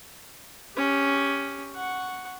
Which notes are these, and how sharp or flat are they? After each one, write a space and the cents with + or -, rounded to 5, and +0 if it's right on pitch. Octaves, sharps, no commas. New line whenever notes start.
C#4 +5 G4 +20
F#5 +0 C#6 +0